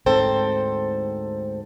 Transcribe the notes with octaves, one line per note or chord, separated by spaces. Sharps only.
D2 G#2 C4 A4 C5 G5